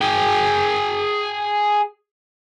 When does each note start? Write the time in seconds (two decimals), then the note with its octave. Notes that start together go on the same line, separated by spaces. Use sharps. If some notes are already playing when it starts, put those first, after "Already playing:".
0.02 G#4 G5